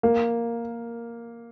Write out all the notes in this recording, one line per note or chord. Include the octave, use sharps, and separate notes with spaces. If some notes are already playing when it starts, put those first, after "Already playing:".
A#3